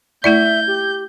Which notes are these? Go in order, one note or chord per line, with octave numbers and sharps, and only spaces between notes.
A3 E4 D5 E5 G6
G4